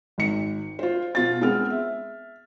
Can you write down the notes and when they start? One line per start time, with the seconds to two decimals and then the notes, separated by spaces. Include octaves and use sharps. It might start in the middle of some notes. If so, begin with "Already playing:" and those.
0.18 G#1 C#7
0.79 F4 C5
1.15 B2 F4 A6
1.41 G#3 B3 C4 F6
1.70 E5